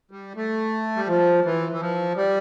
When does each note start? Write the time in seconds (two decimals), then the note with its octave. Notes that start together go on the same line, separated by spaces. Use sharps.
0.11 G3
0.36 A3
0.96 G3
1.07 F3
1.45 E3
1.72 E3
1.80 F3
2.16 G3